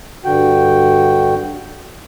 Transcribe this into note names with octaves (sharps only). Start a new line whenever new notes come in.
G2 D3 F#4 G5